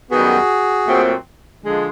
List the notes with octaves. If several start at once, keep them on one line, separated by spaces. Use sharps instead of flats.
F#2 D#3 G3 B3 F#4 G#4
A#2 F#3 A3 C4
D3 F3 G#3